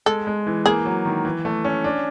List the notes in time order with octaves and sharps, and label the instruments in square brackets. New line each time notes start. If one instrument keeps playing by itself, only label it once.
[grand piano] G#3 [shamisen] A4
[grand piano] G#3
E3
[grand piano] A#3 [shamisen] G#4
[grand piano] F#3
D#3
E3
A3
C#4
D4